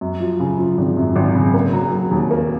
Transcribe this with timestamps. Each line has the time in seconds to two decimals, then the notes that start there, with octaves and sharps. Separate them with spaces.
0.01 F#2
0.20 F3
0.40 C#3
0.59 F3
0.78 G#1
0.97 F#2
1.16 G#1
1.35 C#3
1.54 A#3
1.73 F#3
1.92 F#3
2.11 D#2
2.31 A#3